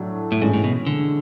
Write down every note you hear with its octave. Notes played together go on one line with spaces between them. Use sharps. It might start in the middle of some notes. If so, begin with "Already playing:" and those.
Already playing: A2 F#3 A3 D4
A2
G#2 E3 G#3 C#4 G#4
A2
B2
D3